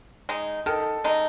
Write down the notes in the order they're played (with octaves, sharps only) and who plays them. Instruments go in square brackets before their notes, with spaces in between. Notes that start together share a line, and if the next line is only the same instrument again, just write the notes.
[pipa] G#3 D#4
[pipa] D#3 [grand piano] A4
[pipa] G#3 D#4